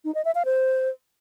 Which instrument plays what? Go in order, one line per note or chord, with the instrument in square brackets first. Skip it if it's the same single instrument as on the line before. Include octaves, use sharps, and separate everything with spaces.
[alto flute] D#4
D#5
E5
F5
C5